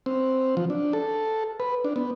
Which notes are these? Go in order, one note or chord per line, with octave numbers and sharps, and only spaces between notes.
C4
F3
D4
A4
B4
D4
B3